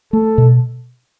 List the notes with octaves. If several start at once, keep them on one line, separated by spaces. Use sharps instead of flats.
A3 A4
B2